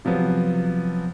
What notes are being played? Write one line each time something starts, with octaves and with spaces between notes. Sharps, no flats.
C3 F3 F#3 B3